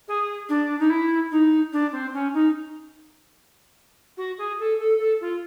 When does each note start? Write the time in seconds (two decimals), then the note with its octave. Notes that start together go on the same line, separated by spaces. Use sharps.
0.08 G#4
0.49 D4
0.79 D#4
0.90 E4
1.31 D#4
1.73 D4
1.92 C4
2.14 C#4
2.34 D#4
4.17 F#4
4.38 G#4
4.59 A4
4.79 A4
4.99 A4
5.21 F4